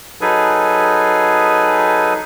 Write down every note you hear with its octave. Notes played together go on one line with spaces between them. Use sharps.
F#3 D#4 G#4 A4 B4 G#5